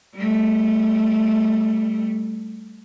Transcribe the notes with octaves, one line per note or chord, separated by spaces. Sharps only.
G3 A3